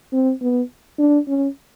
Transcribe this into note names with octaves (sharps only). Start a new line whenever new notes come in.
C4
B3
D4
C#4